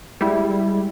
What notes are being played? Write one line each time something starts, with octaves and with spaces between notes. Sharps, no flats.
G3 G#3 E4 G4